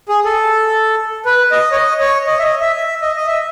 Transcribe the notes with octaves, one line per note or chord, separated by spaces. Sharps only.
G#4
A4
B4
D#5
C#5
D#5
C#5
D#5
E5
D#5
E5
E5
D#5
D#5
E5